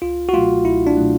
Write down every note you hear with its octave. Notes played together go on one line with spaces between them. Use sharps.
C#2 F4
F#4
B2 F#3 A3 F4
C#2 E4
D4
B2 F#3 A3